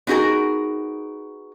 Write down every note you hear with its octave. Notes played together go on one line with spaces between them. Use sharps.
B3 D#4 F#4 G#4 A#4